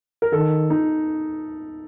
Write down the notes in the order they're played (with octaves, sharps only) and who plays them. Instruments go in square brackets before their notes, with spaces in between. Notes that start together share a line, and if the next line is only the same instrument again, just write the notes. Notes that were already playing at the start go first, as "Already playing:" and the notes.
[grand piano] A#4
[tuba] D#3 [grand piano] A4
[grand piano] D#4